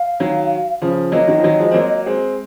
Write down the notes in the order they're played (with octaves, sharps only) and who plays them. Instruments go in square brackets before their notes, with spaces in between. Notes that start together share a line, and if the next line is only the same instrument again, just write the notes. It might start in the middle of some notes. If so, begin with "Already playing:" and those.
Already playing: [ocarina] F5
[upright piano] D#3 F#3
C#3 F3
[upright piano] F#3 A#3 [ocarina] D#5
[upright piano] D#3 F#3
F3
D#3 F#3
F3 G#3
C4
F#3 A#3
G#3 C4